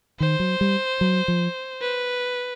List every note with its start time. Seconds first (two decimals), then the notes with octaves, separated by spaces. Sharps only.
0.20 D#3 C5
0.40 F#3
0.61 G3
1.01 F#3
1.28 F3
1.82 B4